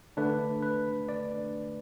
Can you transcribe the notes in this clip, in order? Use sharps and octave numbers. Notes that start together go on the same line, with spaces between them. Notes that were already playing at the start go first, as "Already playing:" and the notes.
D3 A3 D4 B4
B4
D5